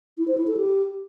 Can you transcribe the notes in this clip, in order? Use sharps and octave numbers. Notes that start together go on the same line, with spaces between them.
E4
C5
E4
A4
G4